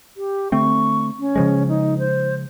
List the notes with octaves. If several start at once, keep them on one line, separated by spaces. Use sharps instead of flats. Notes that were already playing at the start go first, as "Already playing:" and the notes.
G4
D3 A3 C4 C#6
C#4
C#3 F3 G#3
D#4
C5